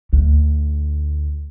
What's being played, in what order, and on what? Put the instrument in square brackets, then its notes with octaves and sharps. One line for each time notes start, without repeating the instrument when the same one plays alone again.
[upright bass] D2